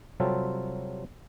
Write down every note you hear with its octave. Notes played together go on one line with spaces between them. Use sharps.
C3 F#3 G3 C4 F4 A4